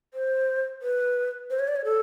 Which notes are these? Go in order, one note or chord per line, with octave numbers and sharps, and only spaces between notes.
C5
B4
C5
C#5
D5
C#5
A4